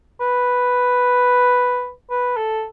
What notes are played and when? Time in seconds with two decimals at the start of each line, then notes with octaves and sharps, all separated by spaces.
0.21 B4
2.10 B4
2.37 A4